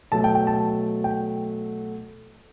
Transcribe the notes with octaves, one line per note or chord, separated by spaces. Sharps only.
B2 F#3 A3 A5
G5
G5
A5
G5